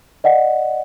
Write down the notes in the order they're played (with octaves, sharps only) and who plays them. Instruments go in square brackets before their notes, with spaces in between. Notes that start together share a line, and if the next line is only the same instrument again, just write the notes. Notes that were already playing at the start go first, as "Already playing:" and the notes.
[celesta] D5 D#5 F#5